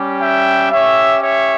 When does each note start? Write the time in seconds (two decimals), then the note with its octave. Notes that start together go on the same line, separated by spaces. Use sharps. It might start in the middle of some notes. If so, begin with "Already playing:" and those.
Already playing: G3 C#4 G4
0.21 E5 G5
0.71 C#4 G4 C#5 E5
1.22 C#5 E5